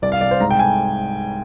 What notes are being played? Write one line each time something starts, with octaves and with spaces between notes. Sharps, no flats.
C2 D5
F5
C2 D5
C5
G#2 A#5
G5
G#5